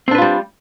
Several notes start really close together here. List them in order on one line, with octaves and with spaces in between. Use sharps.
C4 D4 B4 F4 G3